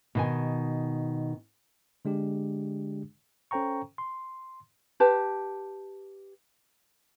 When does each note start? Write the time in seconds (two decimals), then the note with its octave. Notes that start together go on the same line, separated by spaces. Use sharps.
0.15 B2 D#3 G#5
2.05 D3 G#3 D4 G4
3.51 C#4 A4 C5 G5 A#5 C#6
3.98 C6
5.00 G4 B4 A5